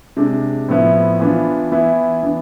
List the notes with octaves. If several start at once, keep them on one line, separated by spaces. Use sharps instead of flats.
C3 G#3 D4
A2 F3 B3 E4
E3 B3 D4 F4
E3 B3 E4
E3 B3 D4